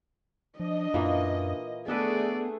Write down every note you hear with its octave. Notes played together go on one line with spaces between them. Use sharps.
F3 D4 D#5
F#2 A#2 E3 A#3
A3 B3 D4 G#4 A4 B4 D5